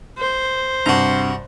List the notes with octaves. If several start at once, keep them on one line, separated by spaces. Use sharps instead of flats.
C5
G2 C3 F#4 A5 A#5